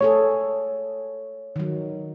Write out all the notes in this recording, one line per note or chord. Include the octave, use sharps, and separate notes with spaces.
A3 G#4 A4 C#5
D#3 F#3